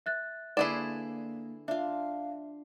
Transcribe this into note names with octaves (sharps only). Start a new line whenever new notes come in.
E5 F#6 A6
D3 A#3 E4 G#4 B4 D5 C6 E7
D4 F4 E5 F5